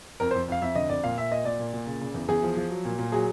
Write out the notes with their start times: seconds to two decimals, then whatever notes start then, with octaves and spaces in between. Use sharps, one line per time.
0.20 F2 A#4
0.31 F2 C5
0.48 F2 F5
0.62 F2 E5
0.75 D3 D#5
0.89 F2 D5
1.04 A#2 F5
1.18 A#2 E5
1.31 A#2 D#5
1.45 A#2 D5
1.59 A#2
1.73 A#2
1.87 C#3
2.01 C#3
2.14 E2
2.28 E2 G#4
2.42 F3
2.57 F3
2.70 F#3
2.85 A#2
2.99 A#2
3.12 F#3 G#4